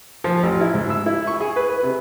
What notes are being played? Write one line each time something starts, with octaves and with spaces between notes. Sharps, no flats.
F3
A1
E4
G#2
E6
E4
C#6
G#4
B4
B4
C3